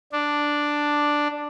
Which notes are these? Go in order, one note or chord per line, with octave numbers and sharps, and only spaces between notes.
D4